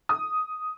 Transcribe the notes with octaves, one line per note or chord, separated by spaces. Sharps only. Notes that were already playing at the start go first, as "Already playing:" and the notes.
D#6